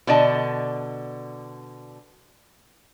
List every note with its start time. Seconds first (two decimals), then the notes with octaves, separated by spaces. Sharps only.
0.07 B2 D3 D5 D#5 G#5 A5